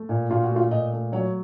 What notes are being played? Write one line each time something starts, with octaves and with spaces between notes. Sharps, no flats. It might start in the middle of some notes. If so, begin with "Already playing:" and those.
Already playing: A3
A#2
A#2 F4
F#4
A3 F4
A#2 D#5
A3
F#3 C#5